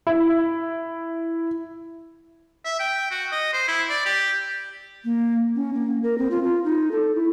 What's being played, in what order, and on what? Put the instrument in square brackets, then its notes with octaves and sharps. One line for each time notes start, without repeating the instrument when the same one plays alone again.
[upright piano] E4
[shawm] E5
G5
F#4
D#5
C5
E4
D5
G4
[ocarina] A#3
C#4
A#3
A#4
C4
F4
F4
D#4
A4
E4